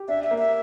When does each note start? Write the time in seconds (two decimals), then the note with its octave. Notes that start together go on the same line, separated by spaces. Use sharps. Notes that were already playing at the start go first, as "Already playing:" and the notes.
Already playing: G4
0.08 D4 E5
0.24 E5
0.31 A#3
0.38 E5